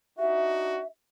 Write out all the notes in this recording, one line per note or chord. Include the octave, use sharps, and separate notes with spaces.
D4 D#4 F#4 E5